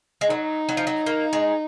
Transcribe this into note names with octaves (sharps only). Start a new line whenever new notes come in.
G#3
F#3 D#4
F#3
F3
F#3
A#3
G#3